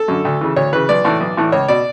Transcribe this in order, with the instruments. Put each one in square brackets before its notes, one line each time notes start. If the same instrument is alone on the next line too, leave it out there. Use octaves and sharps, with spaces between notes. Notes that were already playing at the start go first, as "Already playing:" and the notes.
Already playing: [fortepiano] A4
F#2 D3
D2
C#3 E3
D2 C#5
C#3 E3 B4
B1 D5
A2 E3
B1
A2 E3
C#2 C#5
B2 D5